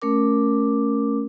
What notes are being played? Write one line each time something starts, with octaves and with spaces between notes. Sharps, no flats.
A3 C#4 A#4 D6